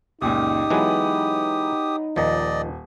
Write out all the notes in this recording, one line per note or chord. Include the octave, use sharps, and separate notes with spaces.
C#2 F#2 A#2 D#4 G4 D#6
E3 F#3 G#3 B3 B4
D#1 D#3 F3 D5 D#5